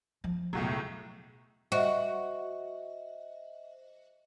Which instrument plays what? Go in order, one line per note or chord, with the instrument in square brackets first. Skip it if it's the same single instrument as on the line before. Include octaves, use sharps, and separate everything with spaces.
[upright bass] F3
[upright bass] E1 [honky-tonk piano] C#2 A2 F#3
[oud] F#4 [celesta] C5 D#5 E5